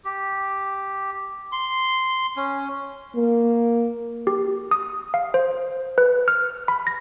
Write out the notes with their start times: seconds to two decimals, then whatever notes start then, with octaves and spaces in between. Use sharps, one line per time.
0.05 G4
1.52 C6
2.36 C#4
3.16 A#3
4.27 G4
4.71 D#6
5.14 F5
5.34 C5
5.98 B4
6.28 F6
6.68 B5
6.87 A#6